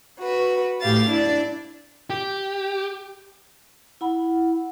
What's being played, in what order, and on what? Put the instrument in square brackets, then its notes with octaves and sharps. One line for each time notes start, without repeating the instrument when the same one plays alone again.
[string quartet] F#4 B4
A2 G4 F5 A6
D4 E4 D5
[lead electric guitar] G4
[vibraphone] E4 F#5 B5